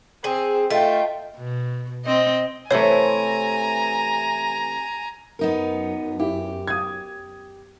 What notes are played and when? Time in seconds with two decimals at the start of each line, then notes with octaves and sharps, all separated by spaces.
0.24 C4 G#4
0.71 A3 F4 D#5 G5
1.37 B2
2.05 C4 D#5
2.71 C3 E3 A3 E4 C5 C#5 G#5 A#5
5.39 F#2 B3 D#4 A#4
6.20 E4 G4
6.67 D#6 G#6